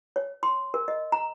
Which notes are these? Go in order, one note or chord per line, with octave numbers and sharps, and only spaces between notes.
C#5
C6
A#4
D#5
A#5